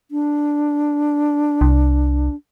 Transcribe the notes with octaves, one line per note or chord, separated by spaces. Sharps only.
D4
C2